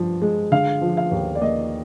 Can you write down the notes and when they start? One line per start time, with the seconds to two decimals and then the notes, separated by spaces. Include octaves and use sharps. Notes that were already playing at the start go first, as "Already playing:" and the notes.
Already playing: G2 F3
0.22 G#3
0.52 D3 F5
0.81 F3
0.97 F5
1.11 D#2
1.35 D5
1.41 A#3 D#5